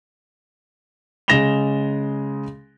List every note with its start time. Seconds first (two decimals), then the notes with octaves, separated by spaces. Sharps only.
1.28 C#3 G#3 A#6 E7 F7 G7